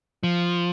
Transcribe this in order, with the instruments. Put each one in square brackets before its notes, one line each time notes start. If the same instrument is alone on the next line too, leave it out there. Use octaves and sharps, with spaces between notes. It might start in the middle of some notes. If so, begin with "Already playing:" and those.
[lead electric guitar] F3